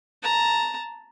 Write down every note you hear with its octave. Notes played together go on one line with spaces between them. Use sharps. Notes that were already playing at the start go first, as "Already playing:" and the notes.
A5 A#5